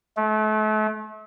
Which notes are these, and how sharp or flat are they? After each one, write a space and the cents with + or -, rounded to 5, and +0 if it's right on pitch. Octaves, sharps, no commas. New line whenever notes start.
A3 -35